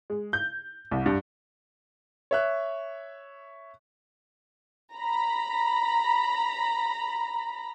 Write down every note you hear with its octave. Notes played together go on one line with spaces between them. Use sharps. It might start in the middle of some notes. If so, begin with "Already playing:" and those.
G#3
G6
C2
G2
C#5 E5 F#6
A#5 B5